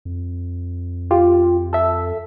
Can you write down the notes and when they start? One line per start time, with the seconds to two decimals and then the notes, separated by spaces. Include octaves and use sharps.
0.05 F2
1.11 F4 G4
1.73 A4 E5